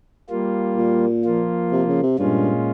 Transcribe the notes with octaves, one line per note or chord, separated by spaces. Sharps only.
G3 A#3 F4
A#2
F3 A#3 F4
C3
C#3
C3
G2 A#2 G#3 C#4 F4